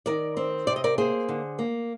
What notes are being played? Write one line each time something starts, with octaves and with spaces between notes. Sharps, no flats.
D#3 A#4 D5
C4
C3 D5
D#5
A#4 D5
A#3 G#4 C5
D3
A#3